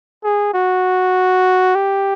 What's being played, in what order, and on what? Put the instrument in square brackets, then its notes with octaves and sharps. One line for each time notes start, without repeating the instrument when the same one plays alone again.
[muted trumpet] G#4
F#4
G4